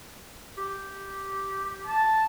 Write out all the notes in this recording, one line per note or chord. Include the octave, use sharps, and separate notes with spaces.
G4
A5